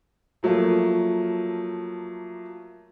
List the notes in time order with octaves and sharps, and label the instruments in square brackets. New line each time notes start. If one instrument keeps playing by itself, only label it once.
[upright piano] F3 F#3 A3 A#3 F4